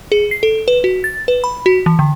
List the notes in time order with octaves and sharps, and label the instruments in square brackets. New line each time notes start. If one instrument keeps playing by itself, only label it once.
[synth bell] G#4
C7
A4
B4
F#4
A6
B4
B5
F#4
E3
D3